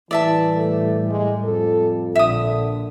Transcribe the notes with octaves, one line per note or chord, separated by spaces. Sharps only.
A2 E3 G3 D5 E5 A5
A3
G#3
F2 A4
A#1 D3 E5 D#6